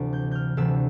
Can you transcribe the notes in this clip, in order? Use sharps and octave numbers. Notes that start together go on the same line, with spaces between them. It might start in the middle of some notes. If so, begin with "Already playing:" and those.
Already playing: D2 C3 E3
G6
F6 G6
D2 C3 E3 E6